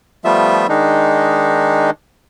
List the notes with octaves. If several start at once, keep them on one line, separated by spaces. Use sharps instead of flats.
F3 G3 A3 B3 F4 E5
D#3 G#3 D4 D#4